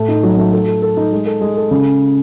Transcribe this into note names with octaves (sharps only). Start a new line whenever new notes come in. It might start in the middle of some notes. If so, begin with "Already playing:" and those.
Already playing: A2 A3
D#4
F#3
A3
A4
A4
A4
D#4
G#3
A4
G#3
A4
C#3